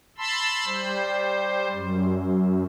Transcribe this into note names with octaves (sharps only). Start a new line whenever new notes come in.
A5 B5 C6 E6
G3 C5
F#2